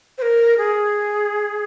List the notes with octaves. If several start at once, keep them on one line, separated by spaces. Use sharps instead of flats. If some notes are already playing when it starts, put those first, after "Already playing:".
C5
A#4
G#4